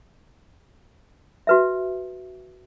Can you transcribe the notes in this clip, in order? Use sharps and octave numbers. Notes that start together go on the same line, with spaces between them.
F#4 B4 E5